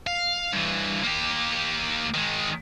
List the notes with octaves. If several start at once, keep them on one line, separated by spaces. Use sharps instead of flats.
F5
G2 E3
A#3 G4
D#3 G#3